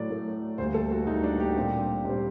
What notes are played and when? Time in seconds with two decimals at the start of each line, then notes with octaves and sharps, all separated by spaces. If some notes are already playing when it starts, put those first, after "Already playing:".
Already playing: A2 F#3 A3 D5
0.10 A2 F#3 A3
0.58 D2 D3 G3 A#3 C5
0.74 A4
0.92 F#4
1.07 D2 D3 G3 A#3 D#4
1.23 D4
1.40 G4
1.57 A#2 G3 C4
2.05 A#2 G3 C4